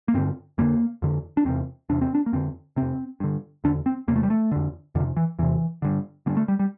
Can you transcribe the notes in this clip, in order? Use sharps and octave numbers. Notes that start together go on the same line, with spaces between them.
A#3
G2 D3 C4
F2 D3 A#3
F2 D3
D4
E2 C3 C4
E2 C3 D4
C4
D4
A#3
F2 D3 C4
F2 C3 C4
G2 D3
E2 D3 D4
C4
E2 C3 A#3
A3
G3
A3
F2 D3
F2 C3 D3
E3
E2 C3 E3
G2 D3
G2 D3 A#3
A3
G3
G3